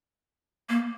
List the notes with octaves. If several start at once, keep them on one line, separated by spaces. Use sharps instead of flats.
A#3